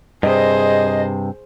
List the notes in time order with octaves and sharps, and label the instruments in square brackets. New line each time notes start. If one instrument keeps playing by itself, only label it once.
[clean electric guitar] G2 C3 [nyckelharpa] G#4 C5 [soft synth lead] D#5